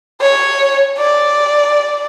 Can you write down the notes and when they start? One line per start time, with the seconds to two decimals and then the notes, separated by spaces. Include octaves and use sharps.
0.21 C#5
0.99 D5